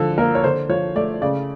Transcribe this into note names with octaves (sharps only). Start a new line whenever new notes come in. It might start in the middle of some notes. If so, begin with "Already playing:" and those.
Already playing: D3 F3 A4
A#3 A#4
C#5
D3 C5
F3 C#5
A3 D5
C#3 D5